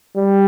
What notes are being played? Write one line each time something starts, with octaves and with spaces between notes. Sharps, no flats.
G3